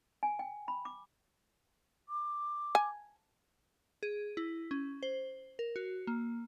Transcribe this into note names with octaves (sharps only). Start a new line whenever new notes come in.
G#5
G5
B5
D6
D6
G#5
G#4
E4
C#4
C5
A#4
F#4
A#3